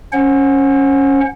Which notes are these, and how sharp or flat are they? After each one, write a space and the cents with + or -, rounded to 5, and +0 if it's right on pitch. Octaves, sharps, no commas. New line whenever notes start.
C#4 -5 C5 +40 F#5 +0